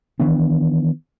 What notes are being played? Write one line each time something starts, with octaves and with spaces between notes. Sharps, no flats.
D#3 E3 B3 D4